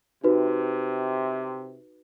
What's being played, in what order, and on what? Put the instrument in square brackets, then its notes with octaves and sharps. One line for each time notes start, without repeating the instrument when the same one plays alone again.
[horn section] C3 [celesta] D#4 F#4 B4